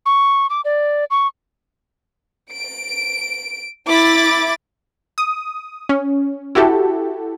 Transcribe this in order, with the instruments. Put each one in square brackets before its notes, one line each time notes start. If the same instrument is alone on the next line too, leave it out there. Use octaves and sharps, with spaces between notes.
[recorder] C#6
D6
D5
C#6
[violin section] D7
E4 D6 A6
[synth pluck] D#6
C#4
E4 F#4 G4 A4